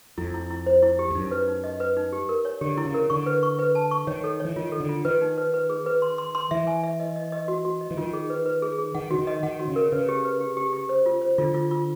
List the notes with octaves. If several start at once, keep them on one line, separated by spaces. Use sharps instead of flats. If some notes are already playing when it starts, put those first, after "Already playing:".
F2 E4
E4
E4
C5
E4
G4
F2
F#2 D#4
B4
D#4
D#5
B4
D#4
G4
A#4
C#5
D3 G4
E4
C#3
A#4
D3 C#6
B4
C#6
B4
A5
C#6
D#3 C#5
A4
E3 C#5
D#3 F4
A4
D3
F4
D#3 B4
D#4
B4
B4
G#4
B4
C6
C6
C6
E3 E5
G#5
E5
D#5
D#5
D#5
F#4
F#4
D#5
E3
D#3 F4
G#4
B4
B4
G#4
G#4
D#3 F#5
D3 F#4
D#3
D#5
D#3 F#5
F#4
C#3
A#4
C#3 B4
G4
B4
G4
G4
G4
C5
F4
C5
D3 F4
F4
F4